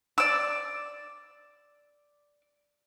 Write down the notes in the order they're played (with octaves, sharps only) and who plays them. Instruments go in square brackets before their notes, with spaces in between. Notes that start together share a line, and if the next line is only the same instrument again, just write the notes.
[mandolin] D5 E6